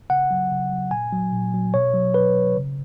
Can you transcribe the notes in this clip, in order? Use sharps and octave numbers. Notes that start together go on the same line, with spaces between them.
C#3 F#5
F#3
C#3
F#3
A#2 G#5
F#3
A#2
F#3
B2 C#5
F#3
B2 B4
F#3
C#3